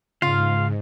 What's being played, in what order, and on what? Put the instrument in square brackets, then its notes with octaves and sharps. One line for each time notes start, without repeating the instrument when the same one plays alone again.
[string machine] G#2 [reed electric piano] C#3 [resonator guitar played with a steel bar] F4 [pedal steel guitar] F5